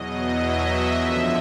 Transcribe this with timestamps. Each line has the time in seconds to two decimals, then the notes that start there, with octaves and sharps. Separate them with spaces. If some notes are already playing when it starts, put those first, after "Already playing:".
Already playing: E2 B2 F#3 D#5
0.35 E5
0.95 F#2 D3 F3 E5